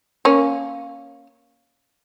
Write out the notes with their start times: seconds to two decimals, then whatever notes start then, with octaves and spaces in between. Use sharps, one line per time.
0.25 A#3 C#4